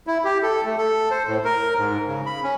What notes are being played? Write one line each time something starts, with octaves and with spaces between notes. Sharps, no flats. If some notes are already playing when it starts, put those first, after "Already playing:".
E4
G4
A4
A3
A4
C5
A2
A#4
G#2
C#3
B5
C#4